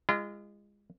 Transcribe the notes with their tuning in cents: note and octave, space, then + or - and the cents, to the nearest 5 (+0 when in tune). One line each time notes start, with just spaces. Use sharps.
G#3 -25 F4 -40